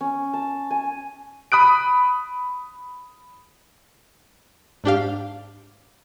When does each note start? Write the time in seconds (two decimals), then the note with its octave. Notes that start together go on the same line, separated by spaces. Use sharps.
0.01 C#4
0.33 A5
0.71 G#5
1.52 B5 D#6 F#6 D7
4.84 G#2 D4 G4 F5